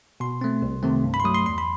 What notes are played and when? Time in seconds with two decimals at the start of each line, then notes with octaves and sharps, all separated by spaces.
0.20 B2 C6
0.41 A3 C4
0.62 C2
0.83 C3 D#3 A3 C4
1.04 G2
1.14 B5
1.20 C6
1.24 F#3 A3 D#6
1.35 C6
1.46 E2 C6
1.58 B5